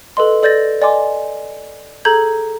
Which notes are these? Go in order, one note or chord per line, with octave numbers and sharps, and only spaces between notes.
A4 B4 D#5 C6
A4 D5 G6 A6 A#6
D5 D#5 G#5 C6 D6
G#4 A4 A#5 G6 G#6 F#7